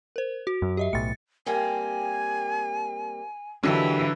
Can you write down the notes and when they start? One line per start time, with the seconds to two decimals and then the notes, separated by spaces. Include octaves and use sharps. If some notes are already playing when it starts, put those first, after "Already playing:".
0.16 A#4 C5
0.47 F#4
0.62 F#2
0.77 G4 D#5 E5
0.93 B1 A2 A6 C#7
1.46 G3 A#3 C4 G#5
3.63 D#2 A#2 D3 E3 F#3 G3